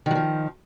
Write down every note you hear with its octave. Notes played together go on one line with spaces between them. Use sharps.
D#3 F3 F#3